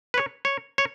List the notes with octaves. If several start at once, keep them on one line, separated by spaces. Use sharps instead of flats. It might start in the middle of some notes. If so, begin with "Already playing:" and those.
B4
C#5
C#5
C#5